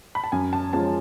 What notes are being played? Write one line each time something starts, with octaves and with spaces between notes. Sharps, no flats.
B5
A5
F#2 G#5
A5
F3 G#3 C#4 F4 A5